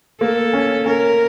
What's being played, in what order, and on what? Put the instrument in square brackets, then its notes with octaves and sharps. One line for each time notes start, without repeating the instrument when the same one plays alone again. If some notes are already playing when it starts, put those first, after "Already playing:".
[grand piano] A#3 [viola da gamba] A4
[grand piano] C#4
[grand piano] C#4 [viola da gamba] A#4